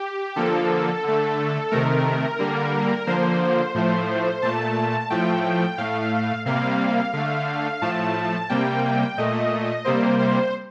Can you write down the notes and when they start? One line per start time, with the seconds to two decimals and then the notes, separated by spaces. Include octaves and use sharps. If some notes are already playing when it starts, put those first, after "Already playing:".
Already playing: G4
0.36 D3 F3 A#3 A4
1.03 D3 A3
1.71 C3 D#3 A3 A#4
2.39 D3 G3 A#3
3.07 D3 F3 A#3 C5
3.74 A2 F3 A3
4.42 A#2 A3 A5
5.10 A2 F3 A3 G5
5.78 A2 A3 F5
6.45 C3 G3 A#3 F5
7.13 D3 A3
7.82 A2 F3 A3 A5
8.49 C3 G3 A#3 G5
9.18 A#2 A3 D#5
9.85 C3 G3 A#3 C5
10.19 C5